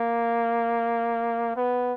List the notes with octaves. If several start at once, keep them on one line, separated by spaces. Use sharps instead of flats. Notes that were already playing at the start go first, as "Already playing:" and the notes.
Already playing: A#3
B3